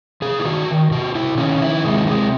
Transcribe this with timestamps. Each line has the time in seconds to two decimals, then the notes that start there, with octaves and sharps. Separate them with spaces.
0.22 C3 G#4
0.40 E4
0.45 D#3 F#4
0.68 D#3
0.91 C3 F#4
1.15 C3 E4
1.38 D#3 C#4
1.61 D#3 E4
1.84 C3 G#3
2.07 C3 G#3